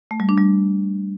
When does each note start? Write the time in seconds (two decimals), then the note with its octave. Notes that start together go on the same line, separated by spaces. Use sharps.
0.11 A3
0.20 G3
0.29 D4
0.38 G3